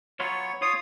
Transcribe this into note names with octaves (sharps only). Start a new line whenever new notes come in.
F#3 B3 F4 C#5
F4 C#5 D#6